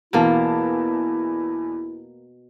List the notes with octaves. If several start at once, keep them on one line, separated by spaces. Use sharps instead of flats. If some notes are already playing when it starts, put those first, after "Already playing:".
E2 B2 E3 A#3 E4 A5